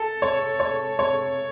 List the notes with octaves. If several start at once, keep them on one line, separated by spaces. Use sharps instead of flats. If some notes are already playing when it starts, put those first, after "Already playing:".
Already playing: A4
C#5
C#5
C#5